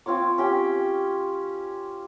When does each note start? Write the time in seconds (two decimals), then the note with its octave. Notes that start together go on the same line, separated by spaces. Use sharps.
0.06 C4 F4 C#5 D6
0.38 C#4 G4 G5